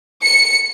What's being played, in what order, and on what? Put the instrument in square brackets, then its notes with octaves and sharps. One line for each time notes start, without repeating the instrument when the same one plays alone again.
[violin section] C#7